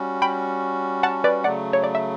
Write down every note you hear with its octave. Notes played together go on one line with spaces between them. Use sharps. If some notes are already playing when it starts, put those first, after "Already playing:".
Already playing: G3 C#4 F#4
G5 B5
F#5 A5
B4 D5
C#3 F#3 A3 D5 F#5
C#5
D5
E5